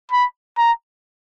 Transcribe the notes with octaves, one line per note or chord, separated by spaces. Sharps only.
B5
A#5